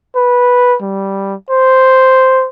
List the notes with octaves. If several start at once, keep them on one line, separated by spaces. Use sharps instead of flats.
B4
G3
C5